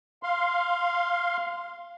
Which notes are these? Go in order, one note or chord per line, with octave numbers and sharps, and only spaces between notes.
F5 C6